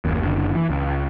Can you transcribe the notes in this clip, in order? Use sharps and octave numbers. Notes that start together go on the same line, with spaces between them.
F#1 D#2
F#1 D3
E3
C#2